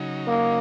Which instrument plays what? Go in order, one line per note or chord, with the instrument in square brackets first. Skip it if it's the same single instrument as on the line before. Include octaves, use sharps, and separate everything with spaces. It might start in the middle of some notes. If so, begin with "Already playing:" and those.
Already playing: [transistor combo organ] C#3 F#3 D#4
[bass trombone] A#3